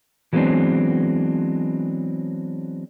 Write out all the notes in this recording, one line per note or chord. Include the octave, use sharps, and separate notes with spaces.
E3 F#3 G#3 B3 C4 D4